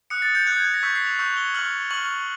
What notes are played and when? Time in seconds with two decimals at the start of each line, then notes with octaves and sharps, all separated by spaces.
0.10 D#6 F#6 C#7
0.22 A6
0.35 G6
0.47 D#6 F#6 G#6
0.56 G6
0.65 G#6
0.74 A#6
0.83 C#6 E6 G6 B6
0.95 C7
1.07 F7
1.19 C#6 E6 G6
1.37 G7
1.54 C#6 F6 F#7
1.91 C#6 F6 F#7